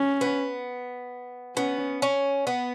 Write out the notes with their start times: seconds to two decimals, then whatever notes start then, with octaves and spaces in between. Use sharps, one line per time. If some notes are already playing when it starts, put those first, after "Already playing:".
Already playing: C#4
0.21 B3
1.57 B3 C#4
2.02 C#4
2.47 B3